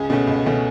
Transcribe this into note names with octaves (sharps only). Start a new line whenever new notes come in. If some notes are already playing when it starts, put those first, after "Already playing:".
Already playing: C#2 G#4
B2 A3 C#4
C#2
B2 A3 C#4